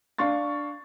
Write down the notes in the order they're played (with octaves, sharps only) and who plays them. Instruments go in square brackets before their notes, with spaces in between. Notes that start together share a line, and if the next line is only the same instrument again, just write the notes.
[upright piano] D4 F5 C#6 A6